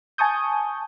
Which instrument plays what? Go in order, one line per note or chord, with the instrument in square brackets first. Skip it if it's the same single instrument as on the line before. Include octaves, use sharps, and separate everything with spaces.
[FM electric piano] G#5 A5 C#6 D#6 G6